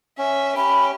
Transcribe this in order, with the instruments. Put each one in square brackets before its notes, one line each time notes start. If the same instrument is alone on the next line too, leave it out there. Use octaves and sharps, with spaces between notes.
[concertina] C#4 [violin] E5
[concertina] C#4 [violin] G4 [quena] B5